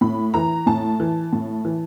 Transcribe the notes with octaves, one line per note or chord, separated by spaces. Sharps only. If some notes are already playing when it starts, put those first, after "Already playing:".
A2 B5
E3 A#5
A2 A5
E3
A2
E3